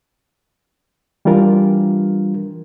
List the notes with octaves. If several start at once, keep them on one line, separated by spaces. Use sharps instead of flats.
E3 G3 D4 F4 A#4